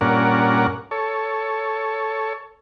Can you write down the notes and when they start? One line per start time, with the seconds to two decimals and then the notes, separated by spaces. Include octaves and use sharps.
0.01 G2 A#2 C#4 A#4 D5 F#5
0.91 A4 C#5